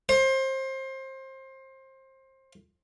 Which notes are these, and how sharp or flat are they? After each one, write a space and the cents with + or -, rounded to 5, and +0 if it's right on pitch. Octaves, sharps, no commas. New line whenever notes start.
C5 +25